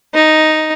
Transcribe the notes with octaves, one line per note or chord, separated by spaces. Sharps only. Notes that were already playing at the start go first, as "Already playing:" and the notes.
D#4